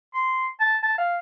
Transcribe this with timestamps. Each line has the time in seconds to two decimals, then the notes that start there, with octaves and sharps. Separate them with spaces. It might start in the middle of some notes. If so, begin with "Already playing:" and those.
0.14 C6
0.60 A5
0.83 A5
0.98 F5